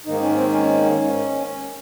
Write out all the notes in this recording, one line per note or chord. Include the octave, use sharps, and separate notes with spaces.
G#2 D#3 A#3 D#4
C#4
C4
C#4